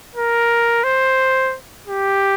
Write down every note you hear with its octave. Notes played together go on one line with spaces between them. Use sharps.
A#4
C5
G4